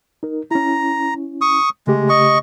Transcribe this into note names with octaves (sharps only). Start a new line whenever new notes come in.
D#4 A#4
C#4 E4 A#5
C#6 D#6
C#3 G#3 A3 G4
D#5 C#6